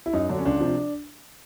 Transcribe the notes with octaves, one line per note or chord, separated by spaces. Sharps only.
E4
F#2 D#4
D3 F#3 D4
C#4
C#2 D4
C3 F3